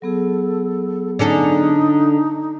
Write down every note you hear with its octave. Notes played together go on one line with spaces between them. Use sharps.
F#3 B3 G#4 A4
D3 C#4 D#4 A4